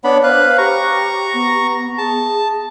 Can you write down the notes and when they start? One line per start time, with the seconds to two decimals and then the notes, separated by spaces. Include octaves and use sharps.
0.04 B3 D4 C#5 B5
0.23 B4 C5 F5 F#6
0.58 G4 A#5 C#6
1.34 B3
1.98 G#4 A5